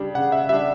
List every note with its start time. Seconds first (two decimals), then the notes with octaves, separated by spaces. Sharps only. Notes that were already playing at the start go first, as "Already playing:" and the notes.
Already playing: C#3 G3 D4
0.15 C#3 F#5
0.32 E5
0.49 G3 D4 E5